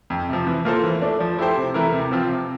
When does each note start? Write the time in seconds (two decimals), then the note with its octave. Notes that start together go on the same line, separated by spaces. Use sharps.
0.10 F2
0.29 C3 F3
0.47 E3
0.65 A#3 F4 A4 C5
0.84 E3
1.02 A3 D4
1.20 F3
1.38 A3 E4 G4 C5
1.56 C3
1.74 E3 A3 E4 A#4
1.92 C3
2.11 F3 C4 F4
2.28 C3